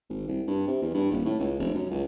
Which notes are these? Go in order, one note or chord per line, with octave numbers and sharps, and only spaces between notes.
G#1
C2
G2
C3
E2
G2
D#1
A2
C#2
F1
F#2
C#2